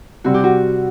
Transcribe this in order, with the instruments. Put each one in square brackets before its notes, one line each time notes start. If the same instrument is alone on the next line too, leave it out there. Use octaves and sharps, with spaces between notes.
[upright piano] C3 G3 C4 [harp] F#4
[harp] G4
F#4